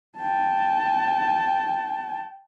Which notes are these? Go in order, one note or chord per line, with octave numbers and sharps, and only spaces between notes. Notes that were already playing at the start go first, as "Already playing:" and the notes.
G5 A5